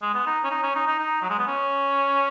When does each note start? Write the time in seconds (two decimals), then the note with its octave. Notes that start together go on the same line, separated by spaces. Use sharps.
0.02 G#3
0.14 B3
0.26 D#4
0.44 C#4
0.51 D#4
0.63 C#4
0.75 D#4
0.87 D#4
0.99 D#4
1.22 F#3
1.30 G#3
1.38 B3
1.47 C#4